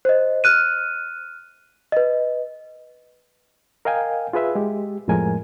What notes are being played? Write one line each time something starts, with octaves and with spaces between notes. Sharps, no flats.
C5 D#5
F6 F#6 D#7
B4 D#5
A#4 D#5 F5 G5 G#5
F4 G#4 B4 E5
G#3 G4
F2 A2 F3 G#3 A#4 G#5